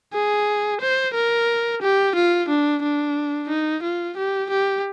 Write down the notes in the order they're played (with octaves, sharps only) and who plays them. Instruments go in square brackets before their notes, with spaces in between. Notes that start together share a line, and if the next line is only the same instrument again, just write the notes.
[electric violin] G#4
C5
A#4
G4
F4
D4
D4
D#4
F4
G4
G4